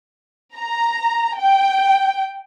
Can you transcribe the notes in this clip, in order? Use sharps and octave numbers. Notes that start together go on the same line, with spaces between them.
A#5
G5